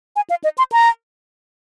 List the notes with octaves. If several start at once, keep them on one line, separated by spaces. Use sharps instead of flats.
G#5
F5
D#5
C6
A#5